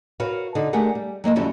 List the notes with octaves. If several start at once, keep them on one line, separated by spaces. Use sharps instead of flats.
F#4 A#4 B4 C#5 F5
D3 D#4 A4
A3 D4 G4 G#4 A#4 F#5
G3
F#3 A#3 D#5 A5
F2 D3 F#3 G3 C#4 E4